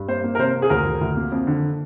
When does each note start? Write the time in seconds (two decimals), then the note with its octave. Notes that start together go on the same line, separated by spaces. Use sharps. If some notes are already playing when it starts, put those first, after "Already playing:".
Already playing: G2
0.08 A#3 C5
0.24 A#3
0.35 A#4
0.38 C3 C5
0.55 A#3
0.62 G#4
0.70 D2 A#4
0.85 D2
1.01 D2
1.16 A#3
1.32 F2
1.47 D3